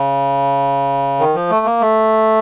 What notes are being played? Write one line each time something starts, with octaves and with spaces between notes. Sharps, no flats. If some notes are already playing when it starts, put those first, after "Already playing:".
Already playing: C#3
D#3
F3
A3
A#3
A3